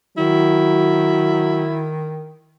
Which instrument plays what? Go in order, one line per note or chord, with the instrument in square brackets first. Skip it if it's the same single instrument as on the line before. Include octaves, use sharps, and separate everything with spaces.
[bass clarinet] D#3 [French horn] F#3 [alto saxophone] E4